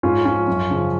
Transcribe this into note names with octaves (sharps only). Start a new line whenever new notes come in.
G#2 C#4 F4
F3 C#4 F4
F#2
C#3 F3